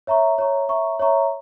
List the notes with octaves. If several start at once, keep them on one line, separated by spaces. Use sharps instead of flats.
C#5 E5 A#5 C#6
C#5 E5 A#5 C#6
C#5 E5 A#5 C#6
C#5 E5 A#5 C#6